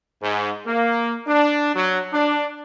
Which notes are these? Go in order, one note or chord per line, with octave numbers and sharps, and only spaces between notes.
G#2
A#3
D4
F#3
D4